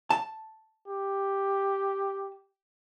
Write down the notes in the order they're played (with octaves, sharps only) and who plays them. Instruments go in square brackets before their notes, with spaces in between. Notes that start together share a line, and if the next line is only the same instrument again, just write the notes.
[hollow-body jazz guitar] A5
[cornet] G4